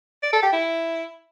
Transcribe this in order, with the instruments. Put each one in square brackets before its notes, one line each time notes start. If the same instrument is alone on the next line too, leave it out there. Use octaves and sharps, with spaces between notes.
[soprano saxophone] D5
A4
G4
E4